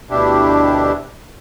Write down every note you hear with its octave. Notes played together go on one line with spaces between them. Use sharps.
D2 B2 D4 E4 G4